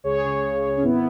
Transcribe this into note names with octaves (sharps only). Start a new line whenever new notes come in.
C#2 G#4 C#5
C#3
C#3
C#2
C#4
G#1 B3 E4